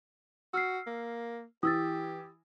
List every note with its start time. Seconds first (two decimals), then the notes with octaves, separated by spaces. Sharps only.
0.54 F#4 E6 F6 C7
0.86 A#3
1.63 E3 G4 D#6 E6 A6